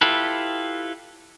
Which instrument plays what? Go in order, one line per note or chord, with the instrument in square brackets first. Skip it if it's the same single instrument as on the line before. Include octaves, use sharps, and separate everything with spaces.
[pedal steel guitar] E4 F4 G4 A4 B4